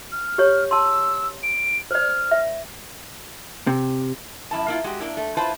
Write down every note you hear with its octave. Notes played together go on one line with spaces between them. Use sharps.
F6
G4 C#5
A5 C6 E6
D7
C5 D5 F6
E5
C3
F#2 E4 A5
A#3 E4 F4
G#3 F#4 G4
A#3 D4 E4
A3
E4 F4 B4 C5 A5